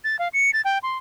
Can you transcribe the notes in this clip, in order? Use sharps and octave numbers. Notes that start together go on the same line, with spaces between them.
A6
F5
C#7
A6
G5
C6